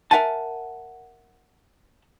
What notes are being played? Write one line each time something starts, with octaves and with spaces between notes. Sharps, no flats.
A#4 B4 E5 F#5 G#5 A5